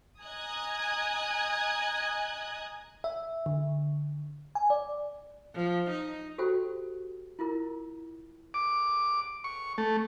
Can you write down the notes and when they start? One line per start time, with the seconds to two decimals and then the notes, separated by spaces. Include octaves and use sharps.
0.22 D#5 G#5 A#5 D#6 F#6 G#6
3.04 E5
3.46 D3
4.55 G#5
4.70 D5
5.55 F3
5.90 D#4
6.38 F#4 G4 A4 C5 G5
7.39 E4 F4 A#4
8.54 D6
9.44 C#6
9.78 A3